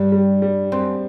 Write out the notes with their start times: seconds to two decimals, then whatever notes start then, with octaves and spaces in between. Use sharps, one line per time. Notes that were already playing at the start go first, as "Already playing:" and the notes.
Already playing: G2 G3
0.12 G3
0.42 G3
0.72 F#2 C4